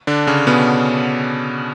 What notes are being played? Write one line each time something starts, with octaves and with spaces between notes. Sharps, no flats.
D3 D4
C#3 C#4
B2 B3